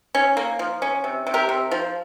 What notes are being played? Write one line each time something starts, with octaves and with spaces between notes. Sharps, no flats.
C#4
A#3
F3
C#4
C3
C3
G4 A#4
C3
F3